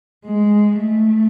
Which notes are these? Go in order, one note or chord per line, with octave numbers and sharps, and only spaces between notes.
G#3
A3